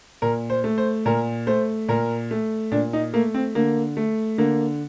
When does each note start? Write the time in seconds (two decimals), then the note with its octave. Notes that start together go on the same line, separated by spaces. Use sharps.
0.22 A#2 A#4
0.50 C5
0.64 A3
0.78 C5
1.05 A#2 A#4
1.47 A3 C5
1.88 A#2 A#4
2.31 A3
2.72 A#2 D4
2.93 D#4
3.13 A3 A#3
3.34 C4
3.55 D3 A#3
3.97 A3
4.38 D3 A#3